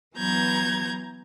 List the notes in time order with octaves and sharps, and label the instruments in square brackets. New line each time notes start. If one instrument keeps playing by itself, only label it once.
[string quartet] E3 F#3 B3 A#5 G6 G#6